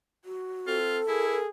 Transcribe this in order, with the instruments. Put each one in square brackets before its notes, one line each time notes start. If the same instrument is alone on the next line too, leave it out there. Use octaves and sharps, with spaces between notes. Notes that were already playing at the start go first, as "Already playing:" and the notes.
[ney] F#4
[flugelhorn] C4 [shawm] F4 [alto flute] A4
[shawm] E4 [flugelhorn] G#4 [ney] A#4